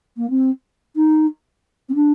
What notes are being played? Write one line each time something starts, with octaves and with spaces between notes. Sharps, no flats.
A#3
C4
D#4
C4
D4